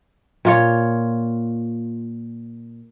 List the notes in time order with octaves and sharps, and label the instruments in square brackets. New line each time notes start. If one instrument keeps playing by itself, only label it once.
[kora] A#2 F4 C#5